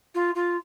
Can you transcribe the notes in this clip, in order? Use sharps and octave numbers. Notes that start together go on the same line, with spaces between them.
F4
F4